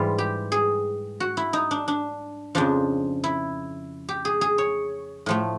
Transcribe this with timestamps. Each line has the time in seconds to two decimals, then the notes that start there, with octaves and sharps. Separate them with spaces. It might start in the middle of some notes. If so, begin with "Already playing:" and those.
Already playing: G#2 E3 G3 F4
0.18 G4
0.52 G#4
1.20 F#4
1.37 E4
1.53 D#4
1.71 D4
1.88 D4
2.55 F2 C#3 F3 D4
3.24 E4
4.09 G4
4.25 G#4
4.41 G#4
4.58 C#5
5.26 A2 F3 A3